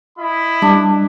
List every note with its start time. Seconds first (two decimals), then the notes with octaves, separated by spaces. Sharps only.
0.19 E4 D#5 B5
0.62 G3 D4